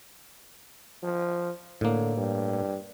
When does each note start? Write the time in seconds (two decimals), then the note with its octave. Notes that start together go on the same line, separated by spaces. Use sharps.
1.03 F3
1.81 A2 D3 A#3
2.16 G2